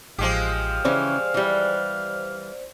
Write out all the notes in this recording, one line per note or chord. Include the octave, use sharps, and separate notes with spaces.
A1 F3 G#3 G4 F5
C#3 E3 C#4 C5 D5
E3 G3